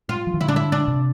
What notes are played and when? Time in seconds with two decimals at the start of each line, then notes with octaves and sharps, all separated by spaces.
0.09 F4
0.27 F3
0.34 E3
0.41 D3 E4
0.48 D4
0.56 E4
0.72 D4
0.88 C3